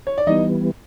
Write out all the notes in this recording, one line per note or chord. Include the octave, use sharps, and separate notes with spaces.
C#5
D5
E3 G3 B3 D#4 D#5